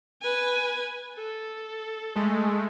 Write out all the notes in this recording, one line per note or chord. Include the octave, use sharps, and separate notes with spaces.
B4 G#5
A4
G#3 A3